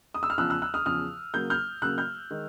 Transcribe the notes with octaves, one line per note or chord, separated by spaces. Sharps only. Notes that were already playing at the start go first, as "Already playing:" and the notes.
D#6
E6
F6
E2 C#3 F3 E6 F#6
E6 F#6
E6 F#6
D#6 F6
E2 C#3 F3 D#6 F6
C#3 F#3 A#3 G6
F6 G6
C#3 F#3 A#3 E6 F#6
F6 G6
D#3 G#3